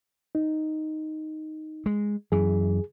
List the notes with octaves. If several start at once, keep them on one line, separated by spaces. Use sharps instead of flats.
D#4
G#3
F#2 E3 G#4